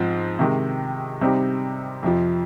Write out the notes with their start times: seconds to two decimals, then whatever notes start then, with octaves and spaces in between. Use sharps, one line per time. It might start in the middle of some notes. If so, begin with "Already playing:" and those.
Already playing: G#2 F3 C4
0.39 C3 D#3 G#3
1.21 C3 G3 C4 D#4
2.03 F2 C3 F3